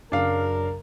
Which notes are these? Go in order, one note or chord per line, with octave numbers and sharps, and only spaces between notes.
F#2 C#3 D4 A#4 F5